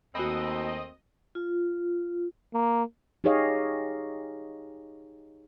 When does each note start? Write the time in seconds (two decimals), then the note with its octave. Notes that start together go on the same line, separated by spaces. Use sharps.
0.15 D#2 A3 A#3 C4 F#4 D#5 G#5 B5
1.35 F4
2.53 A#3
3.24 D#4 G4 G#4 C#5 D#5 F5